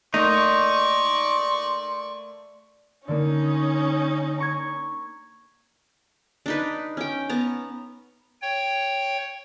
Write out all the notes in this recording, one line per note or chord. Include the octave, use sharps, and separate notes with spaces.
A3 A#3 D#4 D5 C6 C#6
D3 A#3 C#4 D#4
A#5 C#6 G#6
D4 D#4 B4
C#4 G5
B3 A5 A#5
C#5 G5